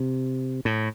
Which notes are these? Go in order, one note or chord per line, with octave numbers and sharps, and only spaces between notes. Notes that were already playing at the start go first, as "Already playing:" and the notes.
Already playing: C3
A2